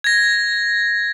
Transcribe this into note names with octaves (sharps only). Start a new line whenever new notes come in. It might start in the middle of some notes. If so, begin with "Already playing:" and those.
G#6 A#6